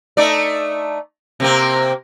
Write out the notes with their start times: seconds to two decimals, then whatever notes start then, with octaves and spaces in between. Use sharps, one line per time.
0.17 A3 D#4 D5
1.40 C3 A#3 C4